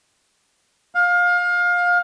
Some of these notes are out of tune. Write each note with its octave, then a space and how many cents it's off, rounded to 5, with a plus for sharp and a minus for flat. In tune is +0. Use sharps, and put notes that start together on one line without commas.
F5 +25